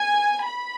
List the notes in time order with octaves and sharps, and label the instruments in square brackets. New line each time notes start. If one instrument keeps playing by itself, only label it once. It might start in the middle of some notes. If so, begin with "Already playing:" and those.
Already playing: [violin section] G#5
B5